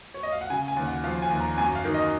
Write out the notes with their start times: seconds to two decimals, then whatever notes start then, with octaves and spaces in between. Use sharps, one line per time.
0.14 C#5
0.23 D#5
0.32 F5
0.41 F#5
0.50 C#3 G#5
0.68 G#5
0.77 D#2
0.86 F#5
1.04 F3 F5
1.22 G#5
1.31 D#2
1.40 A#5
1.58 F#2 G#5
1.75 F5
1.85 D#3
1.94 D#5